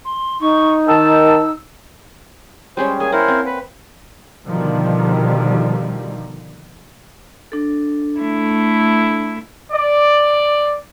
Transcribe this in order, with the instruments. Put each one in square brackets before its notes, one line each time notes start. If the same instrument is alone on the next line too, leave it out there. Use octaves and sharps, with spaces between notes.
[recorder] C6
[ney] D#4 [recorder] C#6
[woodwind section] D#3 A5 [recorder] E6
[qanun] G3 G#3 C#4 [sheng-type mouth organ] C5
[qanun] A#3 [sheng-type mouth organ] G#4 G#5
[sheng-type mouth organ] E4 A#4 C5 [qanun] F#5
[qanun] C4
[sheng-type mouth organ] B4
[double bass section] B2 D3 D#3 F3 G3
[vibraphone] D4 A4
[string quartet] A3 E4
[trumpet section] D5